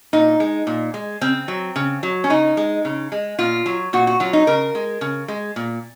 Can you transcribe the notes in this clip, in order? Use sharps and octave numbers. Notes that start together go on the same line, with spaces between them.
A#2 D#4
G#3
A#2
G#3
C#3 C4
F#3
C#3
F#3
C#4
C#3 D#4
G#3
C#3
G#3
A#2 F4
F#3
A#2 F#4
F#4
F#3 F4
D#4
C#3 A#4
G#3
C#3
G#3
A#2